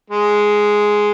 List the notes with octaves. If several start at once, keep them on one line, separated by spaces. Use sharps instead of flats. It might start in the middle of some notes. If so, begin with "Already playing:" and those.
G#3